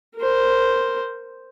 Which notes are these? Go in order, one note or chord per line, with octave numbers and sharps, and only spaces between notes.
A#4 C5